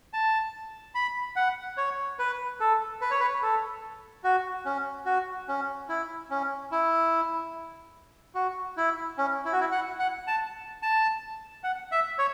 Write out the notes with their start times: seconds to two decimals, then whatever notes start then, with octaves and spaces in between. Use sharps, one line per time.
0.13 A5
0.95 B5
1.36 F#5
1.77 C#5
2.19 B4
2.60 A4
3.01 B4
3.11 C#5
3.20 B4
3.43 A4
4.24 F#4
4.65 C#4
5.06 F#4
5.48 C#4
5.89 E4
6.30 C#4
6.71 E4
8.35 F#4
8.77 E4
9.18 C#4
9.45 E4
9.52 F#4
9.60 E4
9.72 F#5
9.99 F#5
10.27 A5
10.82 A5
11.64 F#5
11.92 E5
12.18 C#5